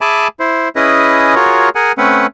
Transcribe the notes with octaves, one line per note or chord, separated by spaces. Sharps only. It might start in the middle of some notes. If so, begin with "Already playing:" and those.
G#4 E5 G#5 A5 B5 D6
E4 C5
C#4 E4 G#4 B4 D#5
F4 F#4 G#4 A#4 C#5
G#4 A#4 F#5 G#5
A3 C4 C#4 B4 F#5